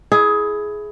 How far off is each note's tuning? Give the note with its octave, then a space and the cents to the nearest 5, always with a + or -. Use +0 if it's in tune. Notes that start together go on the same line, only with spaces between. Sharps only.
E4 +0 G#4 +15